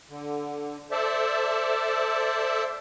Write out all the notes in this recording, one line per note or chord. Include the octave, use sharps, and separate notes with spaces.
D3
A4 C5 D5 E5 A5